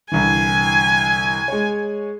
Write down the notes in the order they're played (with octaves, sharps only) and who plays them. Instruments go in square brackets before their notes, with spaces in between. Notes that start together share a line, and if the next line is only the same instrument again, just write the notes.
[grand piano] C2 D3 E3 [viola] G#5
[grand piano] G#3 C#5